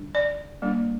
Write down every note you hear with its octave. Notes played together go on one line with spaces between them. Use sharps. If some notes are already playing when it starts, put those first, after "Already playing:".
Already playing: D3 G3 D4
D5
G3 A#3 D4